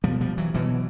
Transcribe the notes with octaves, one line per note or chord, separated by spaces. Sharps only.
B2 F3 G3
F3 G3
E3 F#3
B2 E3 F#3